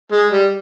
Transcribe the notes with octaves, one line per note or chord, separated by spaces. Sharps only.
G#3
G3